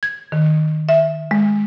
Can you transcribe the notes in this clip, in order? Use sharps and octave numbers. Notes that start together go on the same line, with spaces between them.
G#6
D#3
E5
G#3